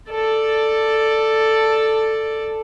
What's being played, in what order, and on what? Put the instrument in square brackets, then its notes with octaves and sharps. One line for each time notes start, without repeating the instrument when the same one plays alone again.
[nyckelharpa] A4 D5